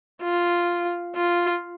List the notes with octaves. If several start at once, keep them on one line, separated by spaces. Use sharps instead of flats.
F4
F4